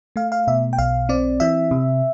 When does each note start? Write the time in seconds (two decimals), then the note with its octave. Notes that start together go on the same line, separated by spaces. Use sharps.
0.16 A3 F5
0.32 F5
0.47 B2 E5
0.73 G5
0.78 B1 F5
1.09 C4 D5
1.40 E3 E5
1.71 C3